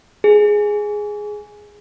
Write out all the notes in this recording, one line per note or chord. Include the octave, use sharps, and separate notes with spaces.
G#4